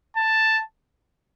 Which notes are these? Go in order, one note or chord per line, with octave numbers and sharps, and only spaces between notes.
A5